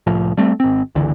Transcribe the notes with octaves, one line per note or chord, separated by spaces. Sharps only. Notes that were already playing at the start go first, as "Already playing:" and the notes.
C2 A2 F3
G3 A3 C4
G#1 C4
G1 C#2 D3 E3